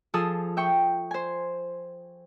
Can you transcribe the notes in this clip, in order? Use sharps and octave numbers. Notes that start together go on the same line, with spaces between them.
F3 G#4 A4 D#6 E6
E5 G5 C#6
C5 G#5